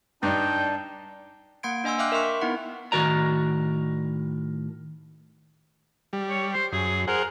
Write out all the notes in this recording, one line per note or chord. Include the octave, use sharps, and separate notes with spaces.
G2 D4 D#4 G5 A5
A#3 F#5 C6 G#6 D7
D4 D#5 G#5 C6 E6
E5 F5 G5 D6 F6 F#6
A#4 E5 G5 C6 C#6 F#6
A#4
B3 D#4 E4 F#5
A2 D#3 F#4 A#4 D5 A#5
G3
C#5
C5
F#2 G#4
G#4 A#4 C5 F#5